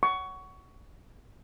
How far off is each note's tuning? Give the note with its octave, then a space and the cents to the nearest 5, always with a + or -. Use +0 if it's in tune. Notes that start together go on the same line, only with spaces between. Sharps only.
C#6 +15